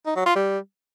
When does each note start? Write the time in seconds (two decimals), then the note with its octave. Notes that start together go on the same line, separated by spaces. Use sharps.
0.06 D#4
0.16 F#3
0.26 F4
0.36 G3